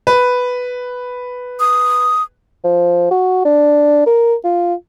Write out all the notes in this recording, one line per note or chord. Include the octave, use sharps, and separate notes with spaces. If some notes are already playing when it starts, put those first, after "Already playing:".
B4
D#6
F3
F#4
D4
A#4
F4